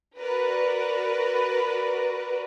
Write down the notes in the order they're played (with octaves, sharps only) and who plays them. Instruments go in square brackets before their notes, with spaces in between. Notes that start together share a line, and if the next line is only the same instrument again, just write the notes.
[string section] F#4 A#4 B4 D5